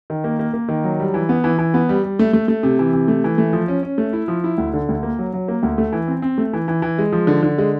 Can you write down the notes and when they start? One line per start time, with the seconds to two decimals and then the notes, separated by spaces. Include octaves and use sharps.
0.10 D#3
0.24 A#3
0.39 A#3
0.54 A#3
0.68 D#3
0.84 F#3
1.00 G3
1.14 E3
1.29 B3
1.44 E3
1.58 E3
1.74 B3
1.89 G3
2.04 G3
2.19 A3
2.33 A3
2.48 A3
2.63 C3
2.79 E3
2.93 C3
3.08 A3
3.24 E3
3.38 A3
3.53 F3
3.68 C#4
3.83 C#4
3.98 A3
4.13 E4
4.28 F3
4.44 E4
4.58 D2
4.73 D3
4.89 D2
5.03 A#3
5.19 F#3
5.33 F#3
5.48 A#3
5.63 D2
5.78 A3
5.92 E3
6.08 C4
6.22 C4
6.38 A3
6.53 E3
6.68 E3
6.82 E3
6.98 G#3
7.12 F3
7.27 D3
7.43 D3
7.58 G#3